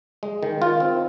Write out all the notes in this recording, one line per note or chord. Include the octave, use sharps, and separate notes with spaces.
G#3
D#3
F4
C4